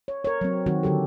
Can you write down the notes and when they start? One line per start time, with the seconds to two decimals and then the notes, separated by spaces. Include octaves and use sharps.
0.08 C#5
0.25 A#4 C#5
0.41 F#3 C4
0.66 D#3 F#3 C4 F#4
0.83 D3 F#3 G4 A4